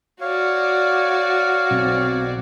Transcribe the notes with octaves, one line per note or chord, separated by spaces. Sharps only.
F#4 C#5 D5 F5
B1 C4